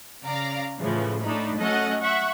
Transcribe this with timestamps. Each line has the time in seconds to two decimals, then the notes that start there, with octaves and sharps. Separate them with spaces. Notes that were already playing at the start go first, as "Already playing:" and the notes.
0.25 C#3 D5 F5 A#5
0.81 A2 C#3 E3 F3
1.23 A2 A3 D4 D#4 B5
1.58 F#3 A3 C#4 A4 D#5 F#5
2.02 E5 F#5 C#6